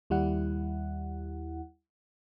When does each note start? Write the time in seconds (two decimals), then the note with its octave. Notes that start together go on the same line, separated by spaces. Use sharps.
0.10 D#2 G3 E4 F#5